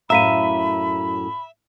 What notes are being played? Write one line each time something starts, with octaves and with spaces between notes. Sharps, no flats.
F#2 A2 E5 F5 A#5 B5 B6 D#7